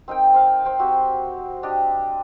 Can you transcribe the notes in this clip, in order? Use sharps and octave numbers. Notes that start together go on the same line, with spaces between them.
C4 D#4 A#4 G5
C5 F5
C5 G5
C4 F#4 G4
D4 G4 D#5